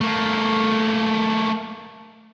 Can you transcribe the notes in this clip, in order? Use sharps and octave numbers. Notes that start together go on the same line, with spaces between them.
A3 A#3